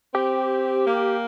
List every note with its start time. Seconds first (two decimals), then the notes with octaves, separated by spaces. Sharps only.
0.14 C4 G4
0.87 A#3